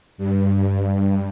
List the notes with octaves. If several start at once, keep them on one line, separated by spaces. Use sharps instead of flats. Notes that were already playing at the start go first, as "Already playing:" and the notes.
G2